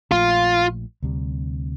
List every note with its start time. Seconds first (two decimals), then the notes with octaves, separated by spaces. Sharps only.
0.11 A#1 A#2 F3 A3 F4
1.03 D2 C3 G3